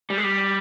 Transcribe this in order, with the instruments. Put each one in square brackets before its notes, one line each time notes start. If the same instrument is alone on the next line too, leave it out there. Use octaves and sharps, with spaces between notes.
[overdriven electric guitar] G3
G#3
G3